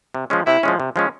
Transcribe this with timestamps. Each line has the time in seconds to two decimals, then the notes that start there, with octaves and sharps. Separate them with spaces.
0.15 C3
0.30 F3 G#3 C#4
0.47 C3 E4
0.63 F3 G#3 C#4
0.80 C3
0.96 F3 G#3 C#4